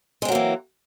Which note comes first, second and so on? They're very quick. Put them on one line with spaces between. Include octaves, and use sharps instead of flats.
G#3 C4 F#3 A#3 E3